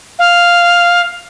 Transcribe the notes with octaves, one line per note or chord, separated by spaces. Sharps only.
F5